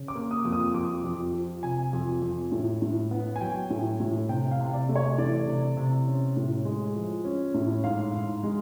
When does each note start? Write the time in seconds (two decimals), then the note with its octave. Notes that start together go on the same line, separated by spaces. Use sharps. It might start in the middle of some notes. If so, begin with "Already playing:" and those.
Already playing: C#3
0.08 D6
0.15 A#3
0.31 D#6
0.45 F2
0.52 D#6
0.74 F2 D6
1.04 F2
1.34 F3
1.63 C3 G#5
1.93 F2
2.22 F2
2.52 A2
2.82 A2
3.11 B3
3.36 G#5
3.41 F#3 G5
3.70 A2
4.00 A2
4.29 C3 G5
4.51 F5
4.59 C3
4.73 D5
4.89 A3
4.96 C#5
5.18 E3 D5
5.47 C3
5.77 C3
6.07 C#4
6.37 A2
6.65 G#3
6.96 F3
7.25 C#4
7.54 A2
7.84 G#2 F5
8.13 G#2
8.43 G#3